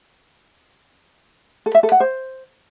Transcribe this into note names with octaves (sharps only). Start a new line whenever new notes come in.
A4
E5
A4
F#5
C5